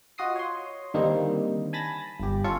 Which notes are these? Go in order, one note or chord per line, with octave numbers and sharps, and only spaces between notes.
F4 F#4 D#5 D#6 C7
C#5 C6
D3 D#3 G3 A#3 C4 D#4
G#5 A5 B5 A6 A#6
G1 G4
C#4 F4 A4 C#6